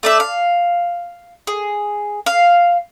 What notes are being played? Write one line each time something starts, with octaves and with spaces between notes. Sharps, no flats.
A3 D5 E5
F5
G#4
F5